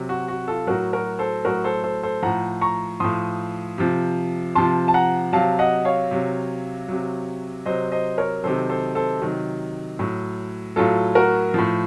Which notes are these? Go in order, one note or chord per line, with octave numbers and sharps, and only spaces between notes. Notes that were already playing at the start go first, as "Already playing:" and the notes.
Already playing: C3 F#3
F#4
F#4
F4 A4
A2 F#3 F#4 A#4
F#4 A#4
A4 C5
A2 F#3 F#4 A#4
A4 C5
A4 C5
A4 C5
A2 F3 F#5 A#5
A#5 C#6
A2 F3 C6 D#6
C3 F3
C3 F3 A5 C6
A5
F#5 A#5
C3 F#3 F5 A5
D#5 F#5
C#5 F5
C3 F#3
C3 F#3
C3 F#3 C5 D#5
C5 D#5
A#4 C#5
C3 D#3 F#3 A4 C5
A4 C5
A4 C5
C3 D#3 F#3
A2 F#3
A2 F#3 F4 A4
F#4 A#4
A2 F3